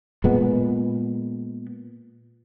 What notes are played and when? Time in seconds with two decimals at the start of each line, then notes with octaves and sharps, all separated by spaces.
0.24 A#2 G#3 B3